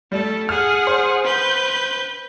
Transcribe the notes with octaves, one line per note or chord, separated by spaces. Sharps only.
G3 A3 A4
G#4 F#5 F6
C5
B4 G6